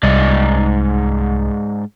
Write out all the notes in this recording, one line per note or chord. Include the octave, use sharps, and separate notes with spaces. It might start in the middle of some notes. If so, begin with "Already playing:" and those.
C2 G#2 D5 D#5